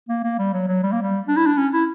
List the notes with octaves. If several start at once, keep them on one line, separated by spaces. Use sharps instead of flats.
A#3
A#3
G3
F#3
F#3
G3
A#3
G3
D4
E4
D4
C#4
E4